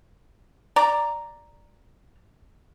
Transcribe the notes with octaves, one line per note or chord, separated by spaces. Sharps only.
D5 A#5